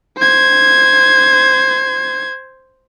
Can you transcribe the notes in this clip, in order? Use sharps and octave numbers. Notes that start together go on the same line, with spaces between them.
C5 G#6